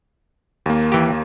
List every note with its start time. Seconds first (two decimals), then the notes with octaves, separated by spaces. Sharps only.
0.66 D#2 A#3
0.92 E3 G4